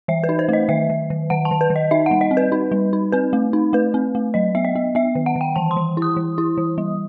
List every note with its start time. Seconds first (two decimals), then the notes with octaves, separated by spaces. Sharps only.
0.08 E3 E5
0.24 B4
0.29 D#4
0.39 C5
0.49 A3 D#5
0.69 D#3 E5
0.90 D#3
1.10 D#3
1.30 D#3 F#5
1.45 A5
1.51 D#3
1.61 B4
1.70 D#3
1.76 D#5
1.91 D#4 E5
2.06 G3 F#5
2.21 D#5
2.31 C4
2.37 B4
2.52 D#4
2.72 G3
2.93 D#4
3.12 C4 B4
3.33 A3
3.53 D#4
3.73 A3 B4
3.94 C4
4.15 A3
4.34 F#3 D#5
4.55 B3 E5
4.65 D#5
4.75 B3
4.95 B3 E5
5.15 D#3
5.26 F#5
5.36 D#3
5.41 G5
5.56 E3 A5
5.71 C6
5.77 E3
5.97 E4 D#6
6.16 E3
6.38 E4
6.57 E3
6.78 G3